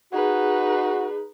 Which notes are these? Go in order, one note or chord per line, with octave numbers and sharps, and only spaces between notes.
D#4 F#4 G#4 B4